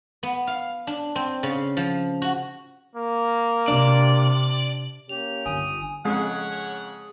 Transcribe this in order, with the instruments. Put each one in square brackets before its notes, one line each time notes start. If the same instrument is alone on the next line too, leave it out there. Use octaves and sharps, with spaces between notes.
[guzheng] B3
F5
D4
C4
C#3
F3
F#4
[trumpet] A#3
[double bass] C3 [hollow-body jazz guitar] D4 [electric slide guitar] D5
[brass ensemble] A#3 C#4 G4 [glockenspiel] F7
[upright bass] G1 D3 [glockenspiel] G#5 [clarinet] D#6
[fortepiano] F2 C#3 [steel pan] G#3 [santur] G#4 [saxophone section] C#5 F#5